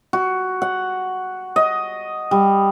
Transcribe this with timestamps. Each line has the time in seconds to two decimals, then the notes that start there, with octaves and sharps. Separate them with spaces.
0.13 F#4
0.62 F#5
1.56 D#5
2.31 G3